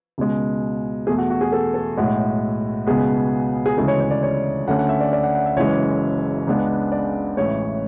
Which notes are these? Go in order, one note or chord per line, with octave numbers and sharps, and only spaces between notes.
C#2 B2 G#3
E2 B2 A3 G#4
F#4
F#4
G#4
A4
A4
B1 A2 G#3 F#4
C#2 B2 G#3 B3 G#4
G#4
D2 C#3 E3 G#3 A4
C#5
C#5
D5
C#5
D2 D3 A3 C#4 F#5
F#5
E5
D5
D5
F#5
F#5
E5
F#1 F#2 E3 G#3 C#5
C#2 C#3 G#3 B3 D4
D5
A1 A2 G#3 C#5